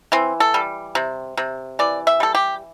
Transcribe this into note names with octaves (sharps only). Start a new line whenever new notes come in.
E3 C4
A4
G3
C3
C3
E3 D5
E5
G3 A4
G4